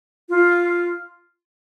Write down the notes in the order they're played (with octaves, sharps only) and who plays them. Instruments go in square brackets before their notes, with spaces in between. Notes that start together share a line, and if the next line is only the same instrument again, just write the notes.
[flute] F4